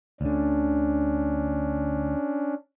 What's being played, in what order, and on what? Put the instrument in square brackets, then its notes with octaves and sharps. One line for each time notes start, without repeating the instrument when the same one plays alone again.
[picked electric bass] D2 D3 [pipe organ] C#4 D4